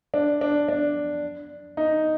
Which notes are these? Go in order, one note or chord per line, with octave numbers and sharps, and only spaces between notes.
D4
D4
D4
D#4